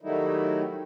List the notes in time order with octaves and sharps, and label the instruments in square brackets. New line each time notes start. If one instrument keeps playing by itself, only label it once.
[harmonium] D#3 F#3 G3 A3 D#4 E4